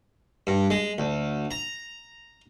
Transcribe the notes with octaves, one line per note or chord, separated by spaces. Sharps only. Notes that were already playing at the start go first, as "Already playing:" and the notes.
G2
G#3
D2
A#5